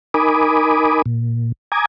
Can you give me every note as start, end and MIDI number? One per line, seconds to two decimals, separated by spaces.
0.14 1.02 63
0.14 1.02 70
0.14 1.02 80
0.14 1.02 83
0.14 1.02 86
0.14 1.02 87
1.06 1.52 46
1.72 1.86 80
1.72 1.86 82
1.72 1.86 86
1.72 1.86 87
1.72 1.86 92